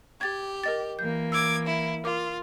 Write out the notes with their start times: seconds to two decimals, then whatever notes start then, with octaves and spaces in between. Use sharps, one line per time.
0.21 G4 G#6 A6
0.64 A#4 D#5 A6
0.99 E3 A#3 G6
1.32 D6 E6 G#6
1.65 E4
2.04 F4 A#4 D6